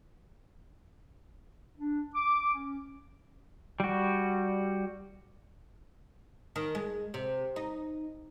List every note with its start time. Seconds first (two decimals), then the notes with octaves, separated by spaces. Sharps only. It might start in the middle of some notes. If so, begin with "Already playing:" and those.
1.78 D4
2.15 D6
2.53 C#4
3.80 G3 F#4
6.56 D#3
6.75 G#3
7.14 C3
7.56 D#4